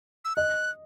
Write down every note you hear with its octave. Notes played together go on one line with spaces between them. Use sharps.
E6
D#5 F#6